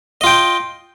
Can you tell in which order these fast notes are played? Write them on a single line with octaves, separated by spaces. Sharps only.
D#5 F4 G5